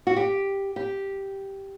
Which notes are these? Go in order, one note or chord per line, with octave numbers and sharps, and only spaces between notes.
F#4
G4
G4